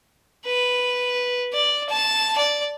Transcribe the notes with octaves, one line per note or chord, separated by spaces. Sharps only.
B4
D5
A5
D5